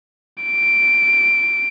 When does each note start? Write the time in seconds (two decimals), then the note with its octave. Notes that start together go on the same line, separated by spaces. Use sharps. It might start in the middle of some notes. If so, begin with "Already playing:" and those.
0.44 D7